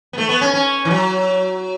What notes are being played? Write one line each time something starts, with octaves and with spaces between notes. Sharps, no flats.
B3
A3
B3
C#4
C#4
E3
F#3